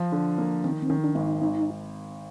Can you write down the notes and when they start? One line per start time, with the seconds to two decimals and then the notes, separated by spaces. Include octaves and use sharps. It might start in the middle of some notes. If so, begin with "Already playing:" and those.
Already playing: F3
0.12 D3
0.38 A#3
0.64 D#3 C4
0.82 C4
0.90 D#3 C#4
1.04 D4
1.15 G#1 D#4
1.41 G#1